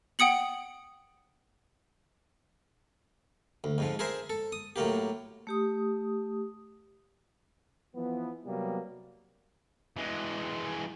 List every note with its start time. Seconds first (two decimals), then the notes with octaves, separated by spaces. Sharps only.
0.19 F#5 G5 D#6 C#7 F#7
3.64 D2
3.78 F2 G#2 F3
3.99 G#4 A#4 C5 E5
4.30 A4
4.52 D#6
4.76 A2 F#3 A#3 G4
5.47 A3 G4 D#6
7.95 E3 F3 B3
8.45 C3 F#3 G3 A#3 B3
9.97 E3 G#3